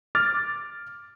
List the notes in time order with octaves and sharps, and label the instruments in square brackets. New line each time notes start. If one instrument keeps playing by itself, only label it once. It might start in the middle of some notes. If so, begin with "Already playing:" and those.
[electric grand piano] D6 F6 A6